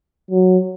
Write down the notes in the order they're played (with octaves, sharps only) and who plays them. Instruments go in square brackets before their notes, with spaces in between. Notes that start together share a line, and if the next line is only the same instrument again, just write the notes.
[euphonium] F#3